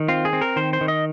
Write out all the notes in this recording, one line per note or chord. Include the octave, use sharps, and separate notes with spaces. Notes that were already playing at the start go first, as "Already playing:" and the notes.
Already playing: D#3
C4 F4
G#4
C4
A#4
D#3 C5
C5
D#3
D#5